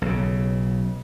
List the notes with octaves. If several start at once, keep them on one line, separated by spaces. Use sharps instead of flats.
B1 C#3